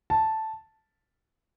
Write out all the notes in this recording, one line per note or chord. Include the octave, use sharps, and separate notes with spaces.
A5